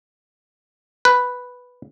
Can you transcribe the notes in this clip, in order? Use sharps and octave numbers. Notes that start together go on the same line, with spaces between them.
B4